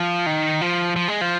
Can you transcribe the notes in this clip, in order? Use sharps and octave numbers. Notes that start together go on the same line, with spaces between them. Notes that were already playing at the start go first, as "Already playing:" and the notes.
Already playing: F3
D#3
F3
F3
G#3
F3